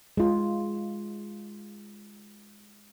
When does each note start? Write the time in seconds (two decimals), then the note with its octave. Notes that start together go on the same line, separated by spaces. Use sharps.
0.17 G#3 F4